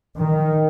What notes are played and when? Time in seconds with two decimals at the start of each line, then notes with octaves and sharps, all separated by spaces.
0.16 D#3